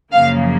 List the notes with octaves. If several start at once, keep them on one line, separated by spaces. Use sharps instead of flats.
F#2 C#3 F3 A#3 F5